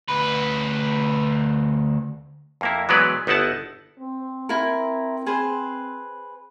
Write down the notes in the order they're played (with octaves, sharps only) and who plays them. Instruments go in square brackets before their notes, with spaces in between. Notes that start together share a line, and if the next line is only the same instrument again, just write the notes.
[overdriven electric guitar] D2 B4
[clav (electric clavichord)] F2 A#3 E4
E3 F#3 G#3 B3 B4 D5
G1 B3 D#4 E4 F#5 A5
[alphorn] C4
[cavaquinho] E4 A#4
G#4 B4 C5